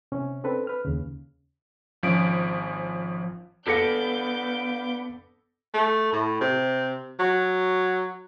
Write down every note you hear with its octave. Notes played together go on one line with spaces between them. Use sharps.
C3 C#4
C4 D4 A4 B4
B4 F6
D#2 C#3
G#1 F3 C#4 D7
B3 D4 A4 F5 D6 G6 A#6 C#7
A3
A2
C3
F#3